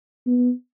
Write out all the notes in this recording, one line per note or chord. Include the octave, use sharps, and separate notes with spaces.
B3